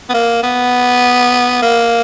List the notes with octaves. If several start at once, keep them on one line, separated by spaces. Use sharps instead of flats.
B3
A#3
B3
A#3